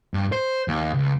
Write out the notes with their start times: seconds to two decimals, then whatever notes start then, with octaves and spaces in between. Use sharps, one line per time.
0.14 G2
0.32 C5
0.68 D#2
0.94 C#2